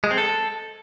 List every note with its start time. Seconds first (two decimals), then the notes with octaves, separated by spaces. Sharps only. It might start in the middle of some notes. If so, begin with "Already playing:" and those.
0.04 G#3
0.11 C4
0.18 A4